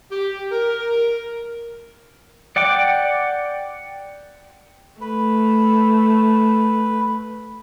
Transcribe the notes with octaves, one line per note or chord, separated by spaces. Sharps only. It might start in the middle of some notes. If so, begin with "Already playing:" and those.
G4
A#4
D5 F#5 G5 D6
A3 B4